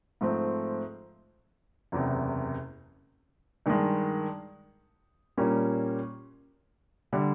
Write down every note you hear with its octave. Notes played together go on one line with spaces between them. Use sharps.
G#2 F3 A3 C4
F#1 E2 C3
G2 D#3 G#3
A#2 G3 A#3 C#4
D3 G3